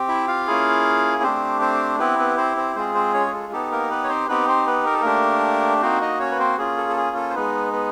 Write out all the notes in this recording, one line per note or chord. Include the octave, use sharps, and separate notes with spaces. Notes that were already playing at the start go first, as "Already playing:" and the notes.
Already playing: C4 G4
E4 E5
F4 F5
A#3 C#4 E4 G#4
A3 C4 D4 G4 C5
C4 C5
B3 C4 E4 G4 B4
B3 B4
C4 C5
C4 C5
G#3 C4 F4 G#4 C5
C4 C5
C#4 C#5
G#4
A4
B3 D#4 G4 A4
A#3 A#4
B3 B4
C#5
C4 C5
B3 C4 D#4 G4 B4
C4 C5
B3 B4
A#4
A4
A3 A#3 D4 G4 A#4
A#3 C4 D#4 F#4 C5
D#4 D#5
C#4 C#5
B4
C4 C5
A#3 C#4 F4 G#4
A4
A4
G#4
A4
C5
G#3 B3 D#4 B4
B3 B4